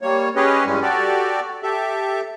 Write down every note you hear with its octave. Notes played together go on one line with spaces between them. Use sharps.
G3 A#3 C#5
C#4 G4 G#4 B4 C#5 D#5
G2 E3 G3 G#3 C#4
F#4 G4 A4 D5
G4 A4 E5